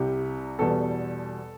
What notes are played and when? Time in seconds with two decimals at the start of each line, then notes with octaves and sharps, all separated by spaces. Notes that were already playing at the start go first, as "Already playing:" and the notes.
Already playing: C2 C3 G3 G4
0.59 E2 B2 G3 A4